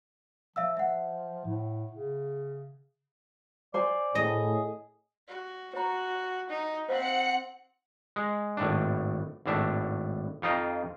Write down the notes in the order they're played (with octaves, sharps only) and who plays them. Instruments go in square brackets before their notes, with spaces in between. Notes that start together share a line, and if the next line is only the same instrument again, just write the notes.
[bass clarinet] F3 [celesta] E5 F5 E6
[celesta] E5 F#5
[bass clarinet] A2
C#3
[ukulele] C5 G#5 [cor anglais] D5
[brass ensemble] A2 [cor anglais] G#4 [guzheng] D#5
[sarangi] F#4
[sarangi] F#4 [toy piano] C#5 A#5
[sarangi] D#4
[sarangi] C4 [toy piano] C5 D5 F5 [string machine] F#5 F#6 C#7
[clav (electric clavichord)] G#3
G#1 A2 D4
G#1 A2 D4 E5
F2 D#4 F4 D#5 G5